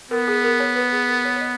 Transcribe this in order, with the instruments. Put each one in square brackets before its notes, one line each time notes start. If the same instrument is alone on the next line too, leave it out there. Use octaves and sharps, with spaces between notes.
[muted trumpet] B3 [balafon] A#4
[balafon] G#4
A#4
C#5
B4
G#4
A#4
C#5
C#5
D#5